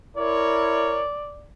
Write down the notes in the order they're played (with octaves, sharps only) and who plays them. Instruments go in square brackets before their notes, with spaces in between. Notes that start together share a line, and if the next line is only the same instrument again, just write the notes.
[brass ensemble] E4 A#4 C#5 [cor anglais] D5